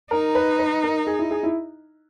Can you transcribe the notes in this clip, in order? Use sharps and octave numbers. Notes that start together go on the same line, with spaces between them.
D#4 A#4
B4
B4
A#4
G#4
E4
G#4
E4